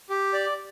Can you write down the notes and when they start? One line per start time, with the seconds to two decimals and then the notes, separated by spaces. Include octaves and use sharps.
0.10 G4
0.33 D5